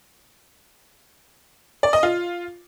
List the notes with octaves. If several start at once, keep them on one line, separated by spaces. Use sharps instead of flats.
D5
D#5
F4